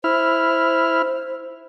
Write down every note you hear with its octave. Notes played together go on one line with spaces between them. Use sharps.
E4 C5 F6